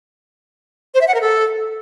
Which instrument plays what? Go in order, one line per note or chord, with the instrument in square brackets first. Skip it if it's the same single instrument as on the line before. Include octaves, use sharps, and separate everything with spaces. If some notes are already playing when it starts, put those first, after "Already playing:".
[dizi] C5
E5
F#5
A#4
A4